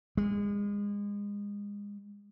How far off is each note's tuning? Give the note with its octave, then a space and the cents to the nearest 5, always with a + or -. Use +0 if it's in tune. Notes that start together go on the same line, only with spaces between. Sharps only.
G#3 -30